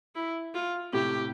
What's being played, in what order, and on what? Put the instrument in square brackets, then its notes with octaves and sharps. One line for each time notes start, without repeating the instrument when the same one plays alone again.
[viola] E4
F4
[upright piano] A2 C3 [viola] G4